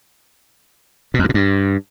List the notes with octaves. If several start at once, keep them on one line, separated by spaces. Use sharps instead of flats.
B2
F2
G2
B2
G2